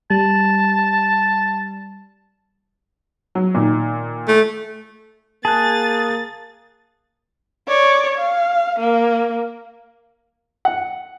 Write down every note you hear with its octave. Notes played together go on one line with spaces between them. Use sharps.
G3 A5
F#3
A#2 D#3
A3
A#3 G#4 A5 F#6 A6
C#5 D5
F5
A#3
F#5